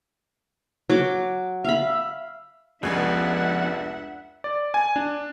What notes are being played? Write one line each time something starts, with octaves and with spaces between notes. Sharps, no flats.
F#3 D6
E5 F5 B5
F1 C#2 F3 B3 D4 C#5 E5 F#5
D5
G#5
D4